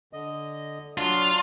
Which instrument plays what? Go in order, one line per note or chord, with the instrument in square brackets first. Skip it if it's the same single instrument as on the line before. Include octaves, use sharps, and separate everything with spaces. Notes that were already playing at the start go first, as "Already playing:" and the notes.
[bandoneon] D3 D#5
[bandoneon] F#3 D4 [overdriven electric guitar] F4